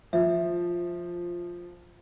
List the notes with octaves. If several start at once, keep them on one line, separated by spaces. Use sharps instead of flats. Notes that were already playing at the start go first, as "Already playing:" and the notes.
F3 E5